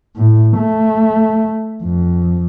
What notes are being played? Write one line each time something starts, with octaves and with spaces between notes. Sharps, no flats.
A2
A3
F2